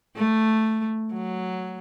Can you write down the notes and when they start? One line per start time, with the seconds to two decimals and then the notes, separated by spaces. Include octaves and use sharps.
0.16 A3
1.14 F#3